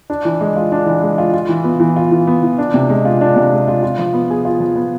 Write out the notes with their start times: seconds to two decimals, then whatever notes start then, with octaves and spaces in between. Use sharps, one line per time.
0.10 D4
0.25 E3
0.41 G#3
0.56 F4
0.72 D4
0.86 E3
1.02 G#3
1.18 F4
1.34 F4
1.49 E3
1.64 B3
1.80 E3
1.96 F4
2.11 E3
2.27 B3
2.43 E3
2.58 D4
2.74 C3
2.89 G#3
3.05 F4
3.21 D4
3.36 C3
3.52 G#3
3.68 F4
3.83 F4
3.99 F3
4.14 B3
4.30 G#4
4.45 F4
4.60 F3
4.76 B3